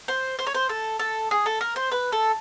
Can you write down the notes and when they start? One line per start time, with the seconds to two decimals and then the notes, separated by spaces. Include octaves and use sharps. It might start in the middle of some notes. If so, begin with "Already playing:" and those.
0.08 C5
0.39 C5
0.47 C#5
0.54 C5
0.69 A4
0.99 A4
1.31 G#4
1.46 A4
1.61 A#4
1.76 C5
1.91 B4
2.12 A4